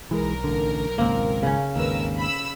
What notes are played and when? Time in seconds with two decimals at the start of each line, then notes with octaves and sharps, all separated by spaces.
0.11 B1 E3 G#3 A#4
0.44 A1 D3
0.98 G#1 C#2 A#3 C4
1.43 C#3 C#4
1.76 G#1 D#2 A#4 B4 E6
2.18 B5 E6